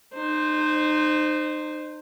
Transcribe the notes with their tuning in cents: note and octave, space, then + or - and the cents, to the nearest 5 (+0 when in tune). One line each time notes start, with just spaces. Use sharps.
D#4 -30 C5 +0